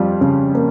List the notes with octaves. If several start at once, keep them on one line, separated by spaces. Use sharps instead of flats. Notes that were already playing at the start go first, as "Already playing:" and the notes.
Already playing: F2 G3 F4
C#3
A#3